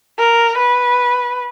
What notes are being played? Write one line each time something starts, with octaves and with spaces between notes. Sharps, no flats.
A#4
B4